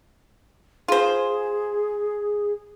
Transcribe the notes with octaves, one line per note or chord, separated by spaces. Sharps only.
F4 G#4 C5